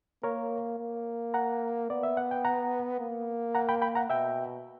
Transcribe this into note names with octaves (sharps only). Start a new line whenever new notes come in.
A#3 A#4 C#5
A#3
F#5 A#5
B3 D5
E5
F#5
G5
F#5 A#5
A#3
F#5 A#5
G5 B5
G5 B5
F#5 A#5
B2 E5 G5